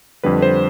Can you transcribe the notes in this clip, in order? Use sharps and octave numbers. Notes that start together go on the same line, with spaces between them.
F2 D3 G3 B4
C5